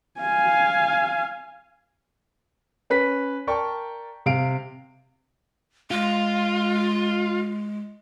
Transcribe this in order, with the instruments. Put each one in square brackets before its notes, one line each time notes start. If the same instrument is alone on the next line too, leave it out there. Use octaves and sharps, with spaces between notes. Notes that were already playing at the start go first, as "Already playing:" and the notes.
[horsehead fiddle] F5 G#5
[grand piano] C#4 B4 B6
A#4 D5 G5 A5 C#6
C3 F5 D7
[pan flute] G#3 [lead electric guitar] F4